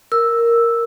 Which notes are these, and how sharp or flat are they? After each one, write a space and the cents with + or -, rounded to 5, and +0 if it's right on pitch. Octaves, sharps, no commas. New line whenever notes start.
A#4 +0 E6 +0